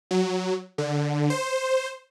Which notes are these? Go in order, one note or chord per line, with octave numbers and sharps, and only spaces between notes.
F#3
D3
C5